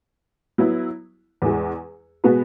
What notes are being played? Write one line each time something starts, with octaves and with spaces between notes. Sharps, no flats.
F#3 B3 E4
E2 E3 G#3
B2 G#3 B3 F#4 B4